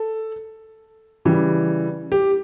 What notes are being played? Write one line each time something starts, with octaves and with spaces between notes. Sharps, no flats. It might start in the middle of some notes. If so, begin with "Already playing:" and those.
Already playing: A4
C#3 E3 G3
G4